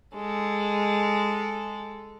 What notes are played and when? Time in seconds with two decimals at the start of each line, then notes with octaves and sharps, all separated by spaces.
0.15 G#3 A4